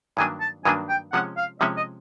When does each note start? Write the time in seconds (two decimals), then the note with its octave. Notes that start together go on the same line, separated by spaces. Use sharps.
0.17 G2 D#3 F#3 A#3 D4 G#5
0.41 A5
0.65 G2 D#3 F#3 A#3 D4 G#5
0.89 G5
1.13 C3 F3 G#3 C#4 F#5
1.37 F5
1.60 C3 F3 G#3 C#4 E5
1.77 D#5